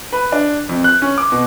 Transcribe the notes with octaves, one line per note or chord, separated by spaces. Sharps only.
B4
D4
F2
F#6
C#4
D6
B2